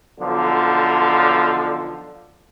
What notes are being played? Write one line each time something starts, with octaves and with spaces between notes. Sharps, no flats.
B1 D3 F3